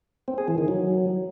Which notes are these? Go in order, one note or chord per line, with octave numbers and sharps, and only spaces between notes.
C4
G#4
E3
D#3
F#3